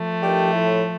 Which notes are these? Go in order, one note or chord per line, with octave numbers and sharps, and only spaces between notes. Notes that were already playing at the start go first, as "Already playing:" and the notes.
Already playing: F3 A3
D#3 G3 D4 G4
A2